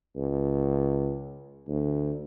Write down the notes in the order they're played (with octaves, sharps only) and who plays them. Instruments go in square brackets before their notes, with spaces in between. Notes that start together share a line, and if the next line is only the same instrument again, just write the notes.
[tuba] C#2
D2